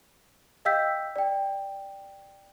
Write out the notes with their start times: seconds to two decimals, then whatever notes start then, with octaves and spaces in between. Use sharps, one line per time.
0.65 D#5 F5 G5 E6 G6 B6
1.16 D5 G5